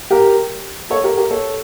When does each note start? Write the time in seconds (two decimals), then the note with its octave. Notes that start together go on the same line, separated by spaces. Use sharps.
0.10 G4 A#4
0.90 A4 C#5
1.04 G4 A#4
1.17 G4 A#4
1.30 A4 C#5